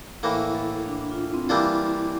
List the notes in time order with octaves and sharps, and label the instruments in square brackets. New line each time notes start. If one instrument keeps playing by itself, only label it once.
[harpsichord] A2 E3 A#3 [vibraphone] E4
[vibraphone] A4
D4
F4
E4
C4
[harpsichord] E3 G3 A#3 D4 F4 [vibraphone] E4